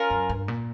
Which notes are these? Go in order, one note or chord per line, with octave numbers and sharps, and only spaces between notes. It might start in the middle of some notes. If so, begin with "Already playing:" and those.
Already playing: C#4 F4 A#4
F#2
G2
A#2